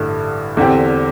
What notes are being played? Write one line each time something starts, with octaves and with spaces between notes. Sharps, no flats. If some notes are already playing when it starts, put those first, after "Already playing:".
Already playing: A1 G2 D3 A3 E4
E2 D3 C4 G4